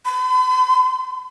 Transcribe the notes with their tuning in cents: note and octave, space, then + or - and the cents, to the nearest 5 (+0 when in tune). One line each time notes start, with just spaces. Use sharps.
B5 +45